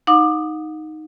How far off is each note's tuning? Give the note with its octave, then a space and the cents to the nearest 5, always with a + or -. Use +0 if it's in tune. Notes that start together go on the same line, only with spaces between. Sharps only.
D#4 +0 F#5 -45 D6 +20